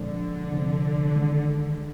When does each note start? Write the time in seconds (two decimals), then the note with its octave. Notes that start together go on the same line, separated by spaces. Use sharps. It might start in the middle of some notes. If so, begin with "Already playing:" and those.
Already playing: A#2 D3 F3 G#3 C4
0.52 C3 F3 C4
1.14 D#3 G#3 D4